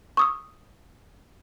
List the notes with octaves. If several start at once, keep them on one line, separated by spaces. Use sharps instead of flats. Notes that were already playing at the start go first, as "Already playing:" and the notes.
C#6 D#6 E6